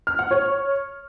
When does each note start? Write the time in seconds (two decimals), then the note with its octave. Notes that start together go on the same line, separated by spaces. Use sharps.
0.07 F6
0.19 F#5
0.31 C#5